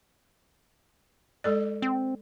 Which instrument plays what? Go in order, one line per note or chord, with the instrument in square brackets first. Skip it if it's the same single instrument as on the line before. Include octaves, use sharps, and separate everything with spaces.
[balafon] G#3 A4 D5
[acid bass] C4